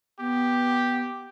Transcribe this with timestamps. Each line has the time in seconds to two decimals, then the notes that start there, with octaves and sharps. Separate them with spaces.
0.19 B3 G4